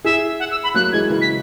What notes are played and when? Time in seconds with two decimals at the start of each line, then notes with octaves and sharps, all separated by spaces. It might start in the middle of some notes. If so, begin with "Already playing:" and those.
0.04 E4 G#4 E5
0.40 F#5
0.51 E6
0.64 B5
0.74 F#3 A#3 F#6
0.92 E3 G#3 G#6
1.10 C#3 E3
1.22 B6